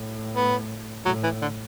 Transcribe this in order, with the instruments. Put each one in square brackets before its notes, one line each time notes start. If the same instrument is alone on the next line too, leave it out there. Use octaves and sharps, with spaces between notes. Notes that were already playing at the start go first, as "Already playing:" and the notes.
Already playing: [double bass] A2
[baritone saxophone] B3
[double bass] A2 [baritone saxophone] F#3
[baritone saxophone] E3
D3